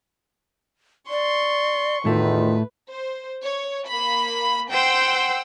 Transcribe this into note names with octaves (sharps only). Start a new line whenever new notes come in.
D5 C6 C#6
E2 A2 D#3 A3 F4 B4
C5
C#5
A#3 B5
C5 F#5 G5 C6 E6